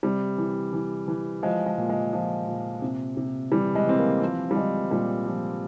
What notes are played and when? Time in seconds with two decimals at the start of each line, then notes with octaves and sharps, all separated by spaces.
0.03 C3 G3
0.38 E3
0.73 E3
1.08 E3
1.43 F3 G#3
1.66 G#3
1.78 A#2
1.89 G#3
2.13 F3
2.47 A#2
2.82 C3
3.17 C3
3.52 E3 G3
3.75 G#3
3.87 E3 C4
3.98 A#3
4.22 F3 C4
4.51 G3
4.56 F3 G#3
4.91 A#2 G3
5.26 F3